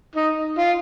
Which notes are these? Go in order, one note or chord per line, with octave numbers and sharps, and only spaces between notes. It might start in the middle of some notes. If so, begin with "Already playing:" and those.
D#4
F4